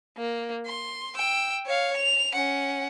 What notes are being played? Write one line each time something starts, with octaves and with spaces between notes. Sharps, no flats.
A#3
C6
G5 E6
C#5 F5
F7
C#4 F#5